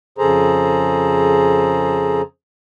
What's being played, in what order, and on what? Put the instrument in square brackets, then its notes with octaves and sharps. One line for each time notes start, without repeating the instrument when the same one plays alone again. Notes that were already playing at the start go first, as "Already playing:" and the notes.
[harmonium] F2 C#3 G#4 A4 C5 A#5